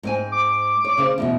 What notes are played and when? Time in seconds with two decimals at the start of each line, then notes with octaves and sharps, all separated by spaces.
0.03 G#2 C4 G#5
0.32 D6
0.85 C#5
0.98 C#3 C5
1.18 E2 G#2 B2